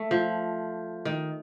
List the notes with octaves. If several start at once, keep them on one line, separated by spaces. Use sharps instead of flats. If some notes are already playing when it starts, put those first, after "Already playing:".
Already playing: A3
F3
D#3